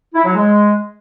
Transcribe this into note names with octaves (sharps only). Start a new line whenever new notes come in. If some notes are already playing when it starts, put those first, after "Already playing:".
E4
F#3
G#3